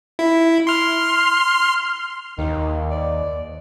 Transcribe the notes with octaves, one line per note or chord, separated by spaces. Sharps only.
E4
C6 F6
D#2 D#3
D5